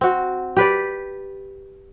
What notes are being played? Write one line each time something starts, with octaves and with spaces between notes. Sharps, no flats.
C4 F#4
G4 B4 D5